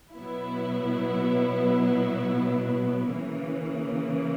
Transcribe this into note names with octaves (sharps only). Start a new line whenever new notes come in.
B2 F#3 B3 E4
C#3 E3 A#3